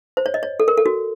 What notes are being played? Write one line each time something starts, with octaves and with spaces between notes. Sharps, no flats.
C5
C#5
D#5
C#5
A4
A#4
A4
F#4